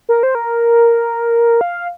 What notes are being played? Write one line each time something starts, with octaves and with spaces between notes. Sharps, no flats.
A#4
C5
A#4
F5